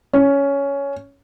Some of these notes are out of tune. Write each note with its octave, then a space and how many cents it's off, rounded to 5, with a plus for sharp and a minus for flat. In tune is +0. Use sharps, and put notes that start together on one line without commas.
C#4 +10